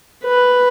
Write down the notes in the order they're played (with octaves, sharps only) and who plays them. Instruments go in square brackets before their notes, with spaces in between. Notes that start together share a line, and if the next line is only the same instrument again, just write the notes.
[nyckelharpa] B4